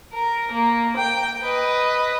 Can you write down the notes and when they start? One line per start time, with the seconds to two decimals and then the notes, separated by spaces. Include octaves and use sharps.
0.13 A#4
0.51 A#3
0.97 G5
1.42 B4 D#5